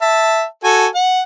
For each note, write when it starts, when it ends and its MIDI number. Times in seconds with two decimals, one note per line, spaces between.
0.02 0.45 76
0.02 0.45 81
0.64 0.87 66
0.64 0.87 69
0.64 0.87 80
0.95 1.22 78